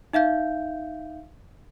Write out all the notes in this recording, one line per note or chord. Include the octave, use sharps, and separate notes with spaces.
D#4 E5 F5 G6